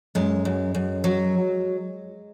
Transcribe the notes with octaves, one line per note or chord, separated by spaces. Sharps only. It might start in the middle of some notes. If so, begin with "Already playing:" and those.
F#2 G#3
F#2
F#2
F#3